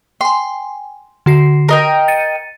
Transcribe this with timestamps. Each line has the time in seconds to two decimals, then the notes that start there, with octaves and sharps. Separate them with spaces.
0.21 G5 G#5 C6
1.26 D3 F#4 C7
1.69 A#4 D#5 G5
2.08 A6 C#7 D#7